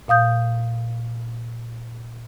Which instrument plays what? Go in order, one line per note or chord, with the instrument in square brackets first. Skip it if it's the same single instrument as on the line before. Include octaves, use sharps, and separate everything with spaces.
[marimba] A#2 F5 D#6 G6